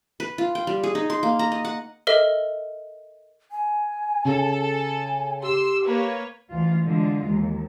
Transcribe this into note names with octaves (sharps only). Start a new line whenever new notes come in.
B4
F4
G5
G3
G#4
D#4
C6
A#3
A#5
D#5
F#5
A4 A#4 D#5 E5
G#5
C#3 A4
G#5
G4 C6 E6
A#3 B4 C#5
D2 E3 F4
D3 E3 G#3 F4
D#2